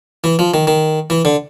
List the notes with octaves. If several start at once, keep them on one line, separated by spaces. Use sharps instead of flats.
E3
F3
D#3
D#3
E3
D3